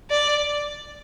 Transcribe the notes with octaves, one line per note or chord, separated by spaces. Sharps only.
D5